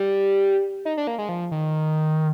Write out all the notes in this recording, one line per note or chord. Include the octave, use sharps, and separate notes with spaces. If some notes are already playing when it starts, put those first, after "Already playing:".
Already playing: G3
D#4
D4
A#3
G#3
F3
D#3